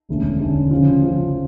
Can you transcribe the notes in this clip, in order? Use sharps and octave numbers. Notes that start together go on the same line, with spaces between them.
E1 D2 D3 A3 C#4
E1 D2 D3 A3 C#4
C#3 F3 C#4 F4
C#3 F3 C#4 F4